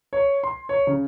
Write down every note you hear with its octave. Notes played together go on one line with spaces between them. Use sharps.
C#5
C6
C#5
C#3